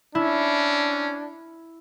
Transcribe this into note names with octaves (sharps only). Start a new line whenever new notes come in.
C#4 D4 E4